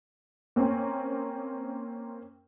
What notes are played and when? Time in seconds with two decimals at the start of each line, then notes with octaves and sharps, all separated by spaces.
0.56 A#3 C4 C#4